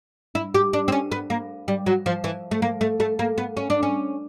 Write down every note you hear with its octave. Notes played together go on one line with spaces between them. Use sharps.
E4
G4
D4
C4
C#4
B3
A#3
G3
F#3
F3
E3
A3
A#3
A3
A3
A#3
B3
C#4
D4
C#4